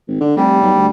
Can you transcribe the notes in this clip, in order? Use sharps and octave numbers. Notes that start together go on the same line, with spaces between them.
G#1
D3
F1 G3
B1
D2